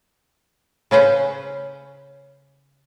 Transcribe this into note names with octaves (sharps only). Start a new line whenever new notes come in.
C#3 C#4 B4 C5